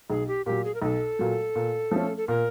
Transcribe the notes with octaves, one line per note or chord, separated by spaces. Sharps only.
B1 G#4
G4
A#2 F#3 G4
G#4
A#4
B1 A4
A#2 F#3
A#2
F3 A3 C#4
A4
A#2 A#4